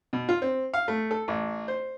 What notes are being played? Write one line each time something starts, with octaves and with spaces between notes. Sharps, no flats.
B2
F4
C4
F5
A3
A4
A1
C5